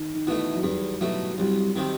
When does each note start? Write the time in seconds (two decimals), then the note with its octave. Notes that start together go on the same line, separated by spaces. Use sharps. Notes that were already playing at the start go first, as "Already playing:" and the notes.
Already playing: D#3
0.15 D#3
0.27 B2 E3 A3
0.55 F#3
0.63 E2 G3
1.01 B2 F#3 A3
1.38 C2 F#3
1.75 C3 D#3 G3